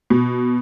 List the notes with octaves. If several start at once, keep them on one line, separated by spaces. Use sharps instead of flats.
B2